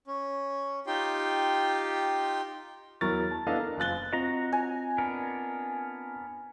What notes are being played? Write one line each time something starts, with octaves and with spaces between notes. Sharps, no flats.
C#4
D#4 F4 G4 G5 C6
E2 F#3 E4 A#4 C#6 A6
A5
B3 D4 E4 A4 D#5 F5
A#4
F#1 F4 F#6 A6 G7
C4 F4 F#4 D#5 A#5
G#5
B3 D4 A#4